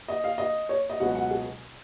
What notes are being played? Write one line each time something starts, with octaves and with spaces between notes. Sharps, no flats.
D#5
F5
D#5
C#5
D#5
C#2 B2 F#3 F#5
F#5
G#4